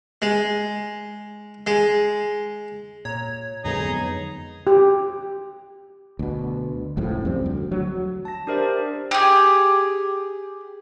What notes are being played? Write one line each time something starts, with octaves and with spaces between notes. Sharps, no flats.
G#3
G#3
A#2 C#5 A#5
F2 G#2 D3 F#3 B3 D#4 G#4 A#5
G4
D2 B2
F1 C#2 A2 F3
F2 G3 C4
D2
F#3
A5 A#6
D4 G4 A#4 C5 D5 E5
G4 G#4